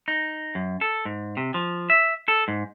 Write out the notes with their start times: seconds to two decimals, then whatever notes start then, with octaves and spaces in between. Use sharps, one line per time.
0.08 D#4
0.55 F#2
0.81 A4
1.05 G#2
1.37 C3
1.54 F3
1.90 E5
2.28 A4
2.48 G#2